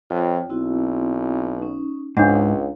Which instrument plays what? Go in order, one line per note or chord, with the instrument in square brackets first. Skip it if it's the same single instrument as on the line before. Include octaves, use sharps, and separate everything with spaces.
[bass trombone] F2 [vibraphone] F4 C#5 G5
[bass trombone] B1 [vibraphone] C4 E4 F#4
[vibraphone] C#4 D#4
[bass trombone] C#2 [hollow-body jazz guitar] G#2 [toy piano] D4 F#5 [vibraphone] C#5 F5